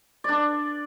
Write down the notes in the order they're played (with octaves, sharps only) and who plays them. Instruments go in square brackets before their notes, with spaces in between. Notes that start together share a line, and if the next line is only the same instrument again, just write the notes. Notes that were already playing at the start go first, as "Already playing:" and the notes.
[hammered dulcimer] D4 D5